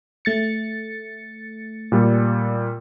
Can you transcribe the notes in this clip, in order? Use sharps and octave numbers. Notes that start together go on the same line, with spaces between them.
A3 A6 C#7
A#2 G3